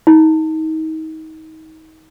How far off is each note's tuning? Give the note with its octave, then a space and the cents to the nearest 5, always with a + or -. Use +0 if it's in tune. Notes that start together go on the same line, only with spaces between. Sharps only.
D#4 +30